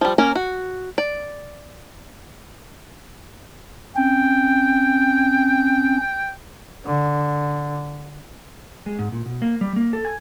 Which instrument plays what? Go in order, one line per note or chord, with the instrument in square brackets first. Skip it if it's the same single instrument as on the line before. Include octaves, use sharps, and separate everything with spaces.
[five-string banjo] F3 G3
A#3 C#4 A#4
F#4
D5
[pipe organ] C4 C#4 [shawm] G5
[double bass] D3
[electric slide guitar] G#3
G#2
A#2
B2
A#3
G3
A#3
A4
G#5